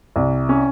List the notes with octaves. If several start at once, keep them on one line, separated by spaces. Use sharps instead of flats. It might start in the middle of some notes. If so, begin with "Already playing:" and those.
C2
C#4